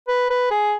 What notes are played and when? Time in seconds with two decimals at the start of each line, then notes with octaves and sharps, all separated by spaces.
0.08 B4
0.30 B4
0.51 G#4